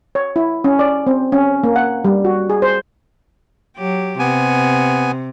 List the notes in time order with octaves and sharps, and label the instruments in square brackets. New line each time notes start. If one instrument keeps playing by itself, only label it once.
[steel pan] C#5
E4
C#4
D5
C4
C#4
A#3
F#5
G3
F#4
G#4
C5
[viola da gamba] F#3 G4
[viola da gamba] C3 [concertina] B3 G#5